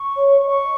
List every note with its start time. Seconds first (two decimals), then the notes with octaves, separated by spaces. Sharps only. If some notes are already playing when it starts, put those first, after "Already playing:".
Already playing: C#6
0.16 C#5
0.46 D#5 C#6